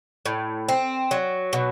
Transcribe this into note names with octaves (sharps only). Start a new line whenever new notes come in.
A2
C4
F#3
B2